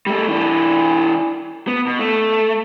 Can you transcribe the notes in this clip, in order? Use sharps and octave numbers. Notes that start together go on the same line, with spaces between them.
G3 A3
E3 D4
B3
B2
A3